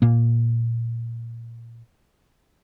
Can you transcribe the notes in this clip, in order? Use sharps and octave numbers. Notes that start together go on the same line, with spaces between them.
A#2 A#3